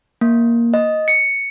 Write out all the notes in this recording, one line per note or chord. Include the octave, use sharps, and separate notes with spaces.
A#3
D#5
C#7